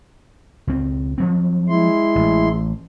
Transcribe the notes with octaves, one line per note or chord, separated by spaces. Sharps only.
C#2 C4
F3 F#3 C4
G#3 E4 C6
A1